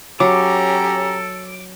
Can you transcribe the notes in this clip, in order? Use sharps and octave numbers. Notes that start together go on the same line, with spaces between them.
F#3 C#4 G4 A4 A#5 D6